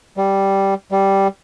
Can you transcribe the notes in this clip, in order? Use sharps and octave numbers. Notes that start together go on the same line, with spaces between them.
G3
G3